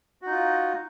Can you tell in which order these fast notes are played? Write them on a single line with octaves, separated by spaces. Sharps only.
F#4 D#4 F4